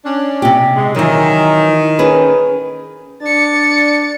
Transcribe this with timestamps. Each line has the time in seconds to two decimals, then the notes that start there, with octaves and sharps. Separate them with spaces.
0.04 C#4 D4
0.42 C3 G4
0.76 G#2 G#3
0.95 D#3 E3 F#3
1.99 C#4 G#4 B4
3.22 D4 A6 C#7